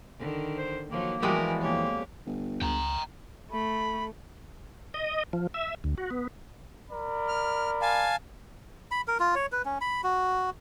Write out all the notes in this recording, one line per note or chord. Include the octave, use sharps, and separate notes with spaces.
D3 D#3
C5
D#3 F3 F#3 A#3
E3 F3 G3 G#3 B3 F#4 G4 A#4
F2 A#3 G4 C#5
G1
C#2 G5 A#5
A3 B5
D#5
F3
E5
D2
F#4
B3
A#4 D5 B5
F6
F5 G#5 A5
B5
A#4
F4
C#5
B4
C#4
B5
F#4